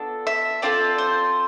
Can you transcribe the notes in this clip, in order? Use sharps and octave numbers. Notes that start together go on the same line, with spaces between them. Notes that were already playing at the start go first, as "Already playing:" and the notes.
Already playing: B3 D4 F4 A4
E5
C4 F4 A4 D5
C5